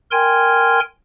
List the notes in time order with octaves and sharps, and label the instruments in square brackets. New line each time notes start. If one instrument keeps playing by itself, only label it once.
[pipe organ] A#4 G5 G#5 C6 F6 G#6